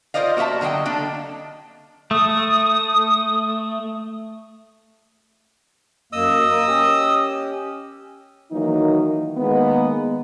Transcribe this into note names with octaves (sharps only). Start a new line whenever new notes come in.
F4 A#4 C5 D5 D#5 F5
A#3 F#4 D5 E5 A5
D3 F#3 A#4 D#5 G5
D3 A#3 D4 A4
A3 D#6
F#2 A#3 D#5 D#6 E6
A#3 A#4
C#4 G4
D#3 E3 F#3 A#3 D#4
D#3 G#3 A#3 B3